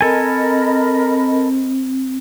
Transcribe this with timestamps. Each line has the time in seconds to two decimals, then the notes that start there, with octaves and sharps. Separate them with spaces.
0.01 C4 A4 A#4 D#5 G#5 B5